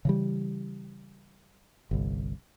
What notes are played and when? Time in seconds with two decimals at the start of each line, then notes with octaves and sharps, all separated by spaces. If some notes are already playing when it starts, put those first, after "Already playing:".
0.05 C#3 E3 G3
1.91 G1 C2